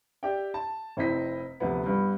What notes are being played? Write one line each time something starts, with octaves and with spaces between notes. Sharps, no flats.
G4 D5 E5 G5
A5
F1 C4 E4 D#5 B6
D2 C3 F3 B3
G2 B3